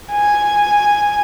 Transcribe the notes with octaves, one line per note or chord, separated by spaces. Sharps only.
G#5